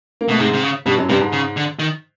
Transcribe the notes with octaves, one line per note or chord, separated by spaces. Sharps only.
A#3
B2 A3
G#2 C3 G#3
C3
C#3
G2 B2 G3
F#2 F#3
G2 C3 G3
G#2 G#3
C#3
D3
D#3